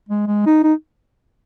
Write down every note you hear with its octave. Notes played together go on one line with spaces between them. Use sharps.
G#3
G#3
D#4
D#4